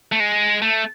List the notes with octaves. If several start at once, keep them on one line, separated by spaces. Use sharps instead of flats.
A3
G#3
A3